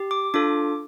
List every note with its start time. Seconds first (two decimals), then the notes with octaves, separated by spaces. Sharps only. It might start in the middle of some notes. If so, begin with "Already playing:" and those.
Already playing: G4
0.11 D6
0.34 D4 F4 A4 D6